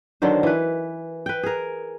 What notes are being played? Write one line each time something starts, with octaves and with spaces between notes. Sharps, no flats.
D3 D#3 F#3 C5
E3 B4
B4 G5
G#4 A#4